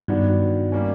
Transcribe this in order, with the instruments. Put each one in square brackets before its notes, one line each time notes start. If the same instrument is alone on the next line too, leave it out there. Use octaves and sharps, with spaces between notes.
[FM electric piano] G2 [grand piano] D#3 F#3 B3 D4 F#4
[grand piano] G3 A#3 C#4